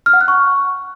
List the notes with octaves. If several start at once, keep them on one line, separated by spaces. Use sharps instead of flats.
F6
F#5
F#6
C#6